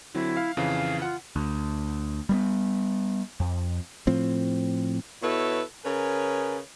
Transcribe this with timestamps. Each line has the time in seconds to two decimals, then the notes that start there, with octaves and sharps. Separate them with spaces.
0.14 D3 F#3 C4 E4
0.37 F5
0.57 F2 C#3 E3 F5
1.02 F4 F#5
1.36 D2
2.29 G3 A3 B3
3.40 F2
4.07 A2 F3 C4
5.23 B2 E4 A4 B4 C#5
5.84 C#3 A#4 B4 C#5 G#5